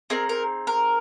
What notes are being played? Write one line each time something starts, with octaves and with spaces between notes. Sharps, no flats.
C4 D#4 G#4 A#4
A#4
A#4